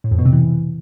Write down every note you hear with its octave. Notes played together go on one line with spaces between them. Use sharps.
A2
F2
B2
C3
E3